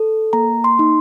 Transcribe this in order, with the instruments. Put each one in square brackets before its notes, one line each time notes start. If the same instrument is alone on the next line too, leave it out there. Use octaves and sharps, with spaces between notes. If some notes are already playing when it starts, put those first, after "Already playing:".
Already playing: [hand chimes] A4
A#3 A#5
C6
D#4